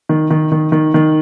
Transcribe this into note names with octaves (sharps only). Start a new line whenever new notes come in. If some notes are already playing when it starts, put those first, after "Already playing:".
D#3
D#3
D#3
D#3
D#3